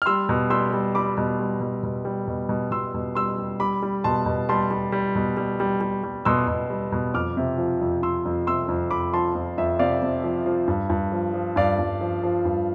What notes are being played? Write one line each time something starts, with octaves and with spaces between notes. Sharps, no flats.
F6
G3 C6 E6
B2
G3 C6 E6
G3
G3 B5 D6
B2
G3
B2
B2
G3
B2
B2
B2 C6 E6
B2
G3 C6 E6
G3
G3 B5 D6
G3
B2 A5 C6
B2
G3 A5 C6
G3
G3
B2
G3
G3
G3
G3
B2 C6 E6
B2
G3
B2
F2 D6 F6
C3
F3
F2
F2 C6 E6
F2
C3 C6 E6
F2
F2 B5 D6
F3 A5 C6
F2
F2 E5
C3 D5 F5
C3
F3
F3
G2
G2
F3
F3
G2 D5 F5
G2
F3
F3
G2